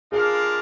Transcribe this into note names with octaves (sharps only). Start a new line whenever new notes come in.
G#3 D4 F4 G#4 A#4 F5